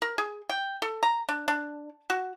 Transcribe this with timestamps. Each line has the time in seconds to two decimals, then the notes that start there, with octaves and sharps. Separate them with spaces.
0.02 A#4
0.18 G#4
0.49 G5
0.82 A4
1.03 A#5
1.29 D4
1.48 D4
2.10 F#4